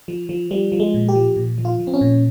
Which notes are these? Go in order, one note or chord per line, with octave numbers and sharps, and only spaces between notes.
F3
F3
F3 G3
F3
G#3
A#2
G4
F3
A#2
F3
F4
F3
C4
C#4
A#2